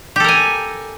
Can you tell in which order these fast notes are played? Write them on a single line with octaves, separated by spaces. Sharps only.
G4 A4 A#4 G#5